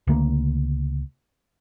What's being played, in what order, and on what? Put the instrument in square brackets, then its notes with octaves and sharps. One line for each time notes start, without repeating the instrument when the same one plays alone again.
[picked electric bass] C#2 D3 A3 A#3